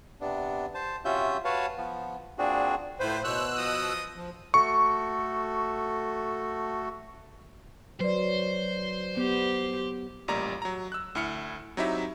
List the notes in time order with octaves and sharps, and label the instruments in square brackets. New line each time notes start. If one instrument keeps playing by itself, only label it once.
[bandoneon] C3 B3 D4
C5 A5
C3 C#4 F4 F#4 E5 G6
F#4 B4 C#5 F5 A5
F3 B3
A#2 C4 D4 F#4 G#4
[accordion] A2 C5 [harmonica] E4 F4 B4
[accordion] B2 E6 F#6 [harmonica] C5 C#5
[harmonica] F3 D#5 D#6
[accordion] F3
[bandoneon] A3 F#4 A4 [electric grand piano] C#6
[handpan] F#3 [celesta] B4 D5 [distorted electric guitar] C5
[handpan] B3 [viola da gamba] G4
[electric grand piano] A1 A#2 G3 G4 D5 A#5
F#3 A#5
E6 F#6
D2 E4 F6 C#7
F#3 C4 D#4 E4 G4 E5